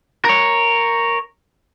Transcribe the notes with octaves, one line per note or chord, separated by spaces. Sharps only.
A#4 C#5